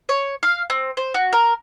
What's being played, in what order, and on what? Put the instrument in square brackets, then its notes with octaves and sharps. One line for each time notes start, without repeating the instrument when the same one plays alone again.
[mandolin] C#5
F5
C4
C5
F#4
A#4